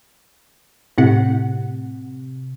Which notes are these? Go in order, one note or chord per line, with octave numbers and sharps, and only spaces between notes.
A2 C3 F#5